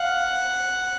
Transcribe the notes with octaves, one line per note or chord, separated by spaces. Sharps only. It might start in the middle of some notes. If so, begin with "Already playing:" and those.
Already playing: F5 F#5